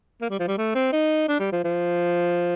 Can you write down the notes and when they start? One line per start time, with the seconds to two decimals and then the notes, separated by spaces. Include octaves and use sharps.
0.21 A#3
0.30 G3
0.39 F3
0.48 G3
0.58 A3
0.75 C4
0.93 D#4
1.28 D4
1.39 G3
1.52 F3
1.64 F3